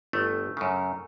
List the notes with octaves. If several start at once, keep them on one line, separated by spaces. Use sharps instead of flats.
G1 A3
F#2 C#3